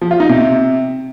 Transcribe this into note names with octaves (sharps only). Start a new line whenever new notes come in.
F3
F4
D#4
C3